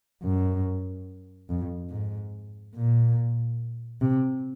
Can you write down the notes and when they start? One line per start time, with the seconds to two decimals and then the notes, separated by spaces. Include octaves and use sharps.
0.23 F#2
1.49 F2
1.91 G#2
2.75 A#2
4.01 C3